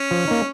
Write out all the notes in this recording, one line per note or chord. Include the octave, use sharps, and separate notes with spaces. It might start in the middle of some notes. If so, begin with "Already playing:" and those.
Already playing: C#4
F3
A#3 D#4